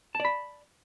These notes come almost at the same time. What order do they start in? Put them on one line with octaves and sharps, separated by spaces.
A5 D5 B5